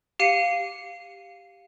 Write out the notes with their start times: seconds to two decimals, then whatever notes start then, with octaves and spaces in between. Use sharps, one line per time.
0.19 G4 F5 C7 C#7 D#7